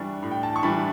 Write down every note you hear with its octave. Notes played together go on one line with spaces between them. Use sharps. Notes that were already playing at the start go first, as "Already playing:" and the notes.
Already playing: E3 G3 D4 C#6
A2
G5
A5
C#6
E3 G3 D4 B5